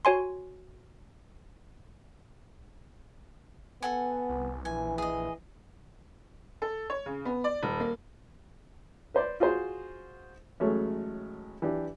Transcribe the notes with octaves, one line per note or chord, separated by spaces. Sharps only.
F#4 C#5 G#5 C6
B3 A4 F#5 G#5
C2
A#1 E3 G#5
G#4 D#5
A4
C#5
C#3
B3
D5
D#1
A#3
B4 C5 D5
F4 F#4 G#4 C5
A1 F#3 G#3 A3 C#5
E3 D4 G4